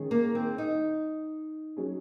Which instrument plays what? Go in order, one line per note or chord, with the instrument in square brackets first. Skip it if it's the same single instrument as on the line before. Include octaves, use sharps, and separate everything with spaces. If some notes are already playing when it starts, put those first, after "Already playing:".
Already playing: [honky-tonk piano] D#3 G#3 C#4 G#4
[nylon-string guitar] A#3
C4
D#4
[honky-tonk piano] F#3 C#4 G#4